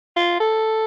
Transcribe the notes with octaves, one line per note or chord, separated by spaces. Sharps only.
F4
A4